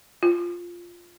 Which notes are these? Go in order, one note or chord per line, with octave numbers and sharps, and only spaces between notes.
F4